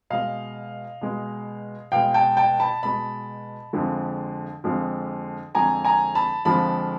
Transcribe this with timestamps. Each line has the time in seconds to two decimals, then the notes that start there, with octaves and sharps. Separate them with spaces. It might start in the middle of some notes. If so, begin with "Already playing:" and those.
0.10 B2 G#3 D#5 F5
1.01 B2 G#3
1.92 B2 G#3 F5 G5
2.14 G5 A5
2.37 G5 A5
2.60 A5 B5
2.83 B2 G#3 A5 B5
3.73 F2 D3 F3 G#3
4.64 F2 D3 F3 G#3
5.54 F2 D3 F3 G#3 G#5 A#5
5.85 G#5 A#5
6.15 A5 B5
6.45 F2 D3 F3 G#3 A5 B5